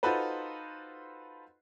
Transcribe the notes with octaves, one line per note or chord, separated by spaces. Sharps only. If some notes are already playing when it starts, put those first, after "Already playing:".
D#4 F4 F#4 A4 B4 C5